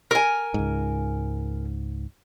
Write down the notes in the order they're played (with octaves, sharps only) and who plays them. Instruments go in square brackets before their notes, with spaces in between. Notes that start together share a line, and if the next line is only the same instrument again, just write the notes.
[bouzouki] A#4 G#5
[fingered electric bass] C#2 G#2